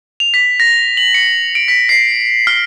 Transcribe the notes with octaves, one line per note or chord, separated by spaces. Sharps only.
F7
B6
A#6
F#7
C#7
D7
B6
C7
F6